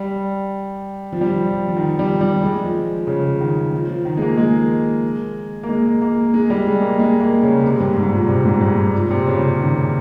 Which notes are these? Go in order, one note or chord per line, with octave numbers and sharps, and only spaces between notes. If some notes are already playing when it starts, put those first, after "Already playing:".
Already playing: G3
F3
G3
F3
F3
D#3
G3
G3
G#3
F3
C#3
D#3
F3
F3
D#3
G#3
A#3
G#3
A#3
G#3
A#3
G#3
G3
G#3
A#3
G#3
A#3
C#3
C3
G2
G#2
A#2
C3
G#2
G2
A#2
C3
C#3
C#3
D#3